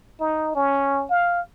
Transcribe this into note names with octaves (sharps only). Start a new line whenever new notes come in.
D#4
C#4
F5